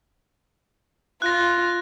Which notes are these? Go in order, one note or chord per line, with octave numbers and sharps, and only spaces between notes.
F4 F#6 A#6